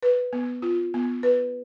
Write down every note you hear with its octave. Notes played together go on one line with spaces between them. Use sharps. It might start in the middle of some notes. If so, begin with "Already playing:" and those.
B4
B3
F4
B3
B4